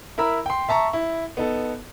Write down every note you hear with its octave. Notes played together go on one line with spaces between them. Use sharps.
E4 A#4 A#5 B5 E6
G5 C6
E5 A5 A#5 C#6
E4
B3 D#4 A4